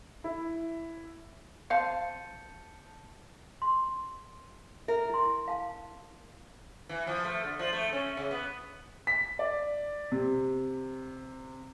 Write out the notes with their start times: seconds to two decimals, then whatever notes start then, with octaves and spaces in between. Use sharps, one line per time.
0.24 E4
1.70 C4 F5 A5 G6 C#7
3.62 C6
4.88 A#4 E5
5.10 E4 C6
5.48 F5 A5
6.89 E3
7.07 F3
7.25 A3
7.44 D3
7.59 F3
7.73 A3
7.93 C#4
8.17 C#3
8.31 B3
9.07 B6
9.39 D5
10.12 C3